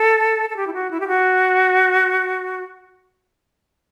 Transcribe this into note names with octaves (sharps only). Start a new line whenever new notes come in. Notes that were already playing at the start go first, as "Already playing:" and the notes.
Already playing: A4
A4
G4
E4
F#4
E4
G4
F#4